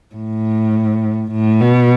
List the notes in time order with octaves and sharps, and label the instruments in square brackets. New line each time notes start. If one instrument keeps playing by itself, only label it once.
[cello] A2
A2
B2